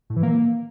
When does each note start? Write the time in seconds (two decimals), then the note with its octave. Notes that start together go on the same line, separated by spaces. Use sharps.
0.10 A2
0.16 E3
0.23 A#3